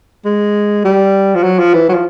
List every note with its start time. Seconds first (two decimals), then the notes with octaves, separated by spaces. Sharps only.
0.25 G#3
0.84 G3
1.35 F3
1.43 F#3
1.59 F3
1.74 E3
1.89 F#3
1.94 F3